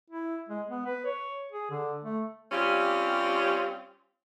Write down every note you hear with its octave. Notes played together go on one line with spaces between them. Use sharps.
E4
G#3
B3
B4
C#5
G#4
D3
A3
G3 C4 C#4 F4 G4